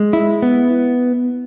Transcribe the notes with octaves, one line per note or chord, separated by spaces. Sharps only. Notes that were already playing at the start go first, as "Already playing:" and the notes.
Already playing: G#3
E4
B3